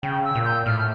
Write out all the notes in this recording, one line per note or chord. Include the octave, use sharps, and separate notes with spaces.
C#3 G5
E6
A#2
G6
A2 F6